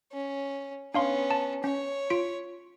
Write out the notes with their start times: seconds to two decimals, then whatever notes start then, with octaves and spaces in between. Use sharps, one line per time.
0.12 C#4
0.94 B3 C#4 D4 F5 C6
1.31 A5
1.64 C#4 C#5
2.10 F4 B6 D7